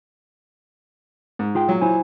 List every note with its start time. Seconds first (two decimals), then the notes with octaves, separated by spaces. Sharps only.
1.39 G#2
1.55 F4 G#4 G5
1.68 A#2 F#3
1.81 E4 C5 G#5